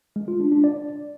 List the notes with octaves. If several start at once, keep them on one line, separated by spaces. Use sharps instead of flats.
G#3
F4
D4
D4
D5